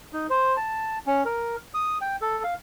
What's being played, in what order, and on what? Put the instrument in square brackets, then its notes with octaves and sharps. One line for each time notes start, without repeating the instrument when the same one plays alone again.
[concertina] D#4
C5
A5
C#4
A#4
D#6
G5
A4
F5